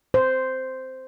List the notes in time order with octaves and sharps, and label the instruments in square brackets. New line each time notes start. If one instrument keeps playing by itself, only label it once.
[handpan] C5